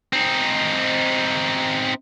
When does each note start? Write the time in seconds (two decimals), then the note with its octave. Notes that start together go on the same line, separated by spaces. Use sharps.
0.13 C4 D#4